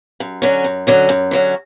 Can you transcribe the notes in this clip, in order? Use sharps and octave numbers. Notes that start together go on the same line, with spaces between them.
F#2
D3 F#3 C#4
F#2
D3 F#3 C#4
F#2
D3 F#3 C#4